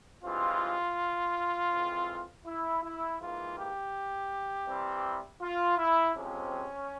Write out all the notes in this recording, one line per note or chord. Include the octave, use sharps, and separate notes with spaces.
G2 E3 G#3 C4 F4
F2 E3 G#3 C4
E4
E4
G#2 E3 A#3 F4
G4
C3 E3 G3 C4
F4
E4
F2 C3 F3 G#3 C4 C#4